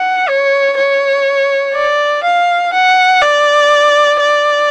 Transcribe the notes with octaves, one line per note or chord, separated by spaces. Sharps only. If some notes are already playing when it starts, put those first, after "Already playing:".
Already playing: F#5
C#5
C#5
D5
F5
F#5
D5
D5